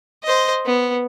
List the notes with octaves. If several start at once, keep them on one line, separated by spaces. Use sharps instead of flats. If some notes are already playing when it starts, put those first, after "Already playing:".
C5 D#5
B3